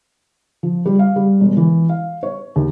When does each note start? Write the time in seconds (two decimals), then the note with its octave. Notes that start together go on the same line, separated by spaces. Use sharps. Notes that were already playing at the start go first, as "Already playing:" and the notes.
0.63 F3
0.86 G3
0.99 F5
1.16 G3
1.40 E1
1.57 E3
1.89 F5
2.23 C#5
2.56 D#2